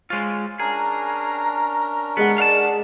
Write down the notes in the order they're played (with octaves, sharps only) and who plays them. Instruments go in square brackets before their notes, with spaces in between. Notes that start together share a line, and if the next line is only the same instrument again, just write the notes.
[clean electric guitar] G#3 F4 [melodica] C5 C#5
[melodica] C#4 D4 A#4 [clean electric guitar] G#4 [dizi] A#5
[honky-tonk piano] G#3 G#4 F#5 [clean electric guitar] B3
[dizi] D5 [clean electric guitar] F5 A5